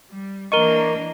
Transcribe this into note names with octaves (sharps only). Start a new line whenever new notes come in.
G3
E3 A#3 D4 A#4 D#5 C#6 D#7 G7